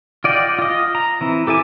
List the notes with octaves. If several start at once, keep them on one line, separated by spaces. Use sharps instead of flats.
F4 D5 D#5 F#5 G5
F4 D#5
A#5
E3 C4 E4
G4 A4 E5 G#5 D6